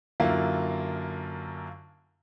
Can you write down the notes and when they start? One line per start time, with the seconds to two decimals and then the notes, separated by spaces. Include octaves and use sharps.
0.20 F#2 D3 A#3 E4 F4